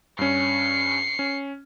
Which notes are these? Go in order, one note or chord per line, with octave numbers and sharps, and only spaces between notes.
G2 C#4 C7 C#7
C#4